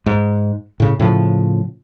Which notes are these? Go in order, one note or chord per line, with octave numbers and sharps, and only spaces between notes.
G#2
A2 C#3
A2 C#3 F3